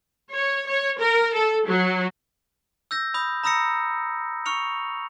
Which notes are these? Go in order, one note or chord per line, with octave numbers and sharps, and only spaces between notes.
C#5
C#5
A#4
A4
F#3
E6 G6 A#6
B5 D#6 G6
A#5 B5 D#6 E6 A#6 C#7
C#6 F6 C#7 F7